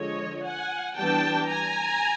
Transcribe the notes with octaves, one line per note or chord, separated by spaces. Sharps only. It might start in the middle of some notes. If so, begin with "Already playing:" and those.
Already playing: D3 F3 G#3 C#5 D#5
F#5 G#5
E3 G3 B3 D4 G5 A5
G#5 A#5